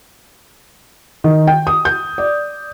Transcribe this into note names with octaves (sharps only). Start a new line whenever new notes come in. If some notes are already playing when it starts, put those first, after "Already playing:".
D#3
G5
D#6
G6
D5